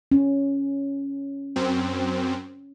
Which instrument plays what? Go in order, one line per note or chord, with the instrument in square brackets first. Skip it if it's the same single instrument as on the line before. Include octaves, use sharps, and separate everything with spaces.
[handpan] C#4
[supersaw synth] F#2 C4